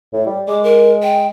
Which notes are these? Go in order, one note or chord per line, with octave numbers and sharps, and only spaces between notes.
A2
G3
G#3 D6
A#4
G5